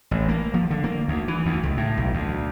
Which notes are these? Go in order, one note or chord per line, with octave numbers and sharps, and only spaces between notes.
A1
A#3
F3
D3
A#3
D2
E3
D2
C#2
A2
B1
D2